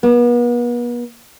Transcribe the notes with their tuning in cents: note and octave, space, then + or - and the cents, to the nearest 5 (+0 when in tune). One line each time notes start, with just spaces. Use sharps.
B3 -40